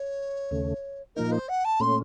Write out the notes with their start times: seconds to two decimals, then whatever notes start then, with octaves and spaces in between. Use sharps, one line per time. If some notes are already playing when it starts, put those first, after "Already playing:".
Already playing: C#5
0.51 D#2 C#3 A3
1.16 A#2 F3 A#3 D#4 A#4
1.32 C5
1.49 F#5
1.65 A5
1.80 A#2 A3 C#4 C6